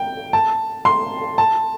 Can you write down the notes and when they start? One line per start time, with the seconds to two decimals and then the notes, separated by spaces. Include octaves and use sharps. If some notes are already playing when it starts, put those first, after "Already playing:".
Already playing: G5
0.33 A5
0.85 C6
1.38 A5